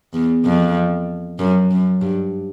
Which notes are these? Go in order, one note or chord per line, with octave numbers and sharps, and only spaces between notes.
E2
F2
F#2
F#2
G2